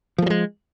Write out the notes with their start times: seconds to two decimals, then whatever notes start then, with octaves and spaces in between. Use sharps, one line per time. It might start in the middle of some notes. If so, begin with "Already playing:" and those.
0.18 F3
0.22 A3
0.26 F#3
0.30 G#3